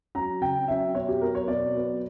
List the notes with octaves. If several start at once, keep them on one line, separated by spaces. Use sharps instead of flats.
F#3 C#4 A#5
C#3 G5
F#3 C#4 E5
B2 C#5
G4
F#3 B3 A#4
C#5
B2 D5
F#3 B3